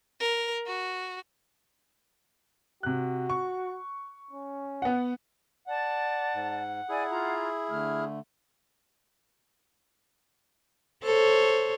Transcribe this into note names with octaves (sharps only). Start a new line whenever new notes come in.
A#4
F#4
C3 F#4 F#6
C#6
C#4
B3 F#5
D5 F#5 A5
G#2
E4 G#4 D5 G#5
F4 F5 A#5
D3 A3 F6
A4 C5 C#5